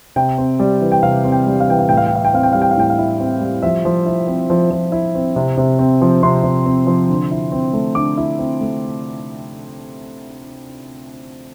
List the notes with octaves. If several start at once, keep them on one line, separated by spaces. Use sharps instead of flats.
C3 G5
C4
G3
E3
G5
C3 F5
C4
G5
G3
F5
E3 G5
F5
A2 G5
F5
G5
E4 F5
G5
C4 F5
G5
G3 F5
G5
F5
A2 G5
F5
E4
C4
G3
F3 E5
F3
E4
C4
F3
F3
E4
C4
C3
C3
C4
F3
C3 C6
C3
C4
F3
D3
E4
C4
A3
D3 D6
E4
C4
A3